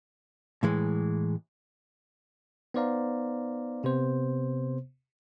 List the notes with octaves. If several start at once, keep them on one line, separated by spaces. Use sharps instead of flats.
A2 E3 G#3
B3 D#4 C5 D5 F5 A#5
C3 B3 C5